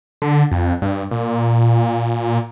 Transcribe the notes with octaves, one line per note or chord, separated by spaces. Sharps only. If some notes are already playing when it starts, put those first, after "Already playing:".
D3
F2
G2
A#2